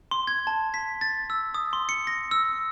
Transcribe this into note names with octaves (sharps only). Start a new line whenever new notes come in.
C6
G#6
A5
B6
A6
E6
D#6
C6
C#7
A#6
E6